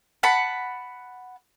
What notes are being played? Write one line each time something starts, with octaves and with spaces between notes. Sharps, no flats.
F#5 A5 B5